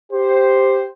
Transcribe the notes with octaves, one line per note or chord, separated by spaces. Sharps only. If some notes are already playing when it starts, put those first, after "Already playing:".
G4 C5